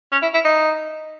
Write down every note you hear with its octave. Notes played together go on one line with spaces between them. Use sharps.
C#4
E4
E4
D#4